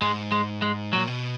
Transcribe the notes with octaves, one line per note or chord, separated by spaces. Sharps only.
G#2 G#3
G#3
G#3
A#2 F#3
B2